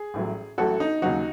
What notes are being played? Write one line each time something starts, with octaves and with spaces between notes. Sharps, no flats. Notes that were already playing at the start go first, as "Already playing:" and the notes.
Already playing: G#4
A1 A2 F#3
A1 A2 F#3 F#4 A4
D#4
D#2 C#3 F#3 D#4 F#4